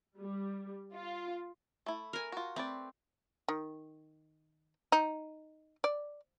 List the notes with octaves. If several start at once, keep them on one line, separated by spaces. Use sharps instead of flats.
G3
F4
A3 E4
A#4 G#5
F4 F#4
A3 C4 B4 D5
D#3
D#4
D5